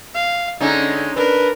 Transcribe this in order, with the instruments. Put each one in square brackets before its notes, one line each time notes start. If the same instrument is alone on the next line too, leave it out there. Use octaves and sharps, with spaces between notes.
[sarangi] F5
[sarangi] D3 [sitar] G#3 C#4 D#4
[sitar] D4 [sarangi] A#4 [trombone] B4